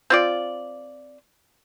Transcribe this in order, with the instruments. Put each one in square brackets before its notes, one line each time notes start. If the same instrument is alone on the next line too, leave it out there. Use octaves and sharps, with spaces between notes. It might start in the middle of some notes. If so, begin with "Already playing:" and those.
[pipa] C4 F4 D5